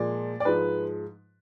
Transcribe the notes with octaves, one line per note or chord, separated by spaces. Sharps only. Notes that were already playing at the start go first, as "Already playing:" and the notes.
Already playing: A#2 F3 G#3 D5
D5
G#2 F3 G#3 B4